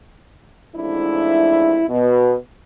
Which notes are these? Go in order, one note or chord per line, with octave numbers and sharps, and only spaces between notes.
A1 F2 G#2 D4 E4
B2